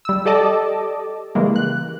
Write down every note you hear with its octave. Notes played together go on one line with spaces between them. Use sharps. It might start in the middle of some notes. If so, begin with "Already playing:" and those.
G3 E6
G4 A4 D5 D#5 A5 D6
C#3 E3 G3 G#3 A#3
F#6